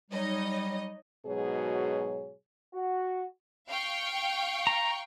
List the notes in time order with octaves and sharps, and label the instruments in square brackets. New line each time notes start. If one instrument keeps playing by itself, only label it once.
[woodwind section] F#3 G3 [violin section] D#4 C#5 D#5
[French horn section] G#2 B2 F#3 G#4 C#5
[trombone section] F#4
[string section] F5 G5 C#6
[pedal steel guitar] A#5